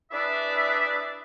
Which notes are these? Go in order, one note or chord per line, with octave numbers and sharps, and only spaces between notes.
D4 E4 G#4 B4 D5 E5